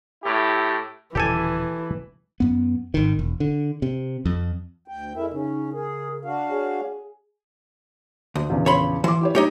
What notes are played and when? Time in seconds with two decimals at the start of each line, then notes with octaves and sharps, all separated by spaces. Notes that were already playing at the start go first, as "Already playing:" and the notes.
0.24 A2 E4 G4
1.15 D#1 B2 D3 E3 G4 A4 G#5
2.40 F#2 B3
2.94 G#1 D#3
3.19 E1
3.40 D3
3.82 C3
4.25 F2
4.88 D2 G5
5.16 F2 G#3 E4 A#4 E5
5.33 C#3 C#4 D#4
5.73 G#4 A#4
6.25 D4 F#4 F5
6.49 G#4 C#5
8.35 D2
8.49 A#1 E2 C#3
8.66 C#5 B5 C6
9.04 E3 C6 D6
9.21 E4 G4 C#5
9.35 G3 D#4 G4 C#5